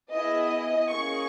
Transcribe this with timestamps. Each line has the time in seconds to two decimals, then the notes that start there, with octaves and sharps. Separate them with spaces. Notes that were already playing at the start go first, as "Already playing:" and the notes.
0.12 B3 E4 G#4 D#5
0.90 A#3 C#4 G#4 C#6